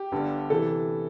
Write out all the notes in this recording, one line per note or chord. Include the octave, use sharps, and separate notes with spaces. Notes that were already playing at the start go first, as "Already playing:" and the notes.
Already playing: G4
G1 G2 D3
C3 E3 A4